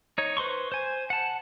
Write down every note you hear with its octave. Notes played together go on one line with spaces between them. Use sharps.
D#4 C#5
B4 C5 C6 C#6
C5 G#5
F#5 A5